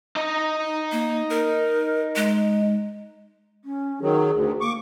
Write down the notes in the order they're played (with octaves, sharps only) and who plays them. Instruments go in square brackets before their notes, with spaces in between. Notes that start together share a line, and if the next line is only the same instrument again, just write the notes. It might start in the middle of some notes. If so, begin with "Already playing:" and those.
[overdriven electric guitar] D#4 D#5
[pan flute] A#3
A#4
G#3
[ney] C#4
[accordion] D#3 F#3 [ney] G#4
[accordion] D2
[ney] A#3 [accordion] C#6 D6